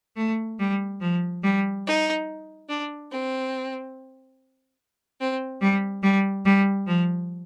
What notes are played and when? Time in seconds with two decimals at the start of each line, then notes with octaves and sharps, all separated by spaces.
0.17 A3
0.59 G3
1.02 F3
1.43 G3
1.85 D#4
2.69 D4
3.10 C4
5.20 C4
5.61 G3
6.03 G3
6.45 G3
6.87 F3